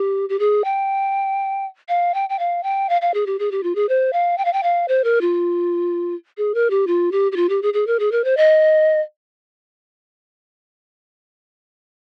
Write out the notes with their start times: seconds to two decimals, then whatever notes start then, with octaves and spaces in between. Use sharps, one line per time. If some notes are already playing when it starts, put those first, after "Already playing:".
Already playing: G4
0.29 G4
0.39 G#4
0.64 G5
1.89 F5
2.14 G5
2.30 G5
2.39 F5
2.63 G5
2.89 F5
3.02 F5
3.14 G#4
3.26 G4
3.39 G#4
3.51 G4
3.63 F4
3.75 G#4
3.89 C5
4.13 F5
4.38 G5
4.45 F5
4.53 G5
4.63 F5
4.88 C5
5.04 A#4
5.21 F4
6.38 G#4
6.54 A#4
6.70 G4
6.87 F4
7.12 G4
7.32 G4
7.36 F4
7.49 G4
7.62 G#4
7.74 G#4
7.87 A#4
7.99 G#4
8.12 A#4
8.24 C5
8.37 D#5